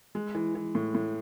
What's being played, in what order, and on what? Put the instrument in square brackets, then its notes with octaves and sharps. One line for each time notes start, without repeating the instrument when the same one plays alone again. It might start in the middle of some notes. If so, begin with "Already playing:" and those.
[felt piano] G#3
E3
E3
A2
A2